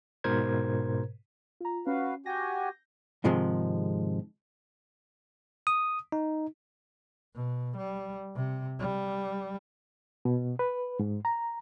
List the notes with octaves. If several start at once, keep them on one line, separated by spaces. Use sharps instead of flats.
G#2 B2 A#4 C5 G#6
F4 A#5
C#4 F#4 B4 F5
F#4 G4 G#5 G6 A#6
G#2 C3 D#3 F3 G#3
D#6
D#4
B2
G3
C3
G3
B2
B4
G#2
A#5